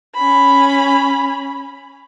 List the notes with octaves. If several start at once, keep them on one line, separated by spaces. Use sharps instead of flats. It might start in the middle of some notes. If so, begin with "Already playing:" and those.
C#4 B5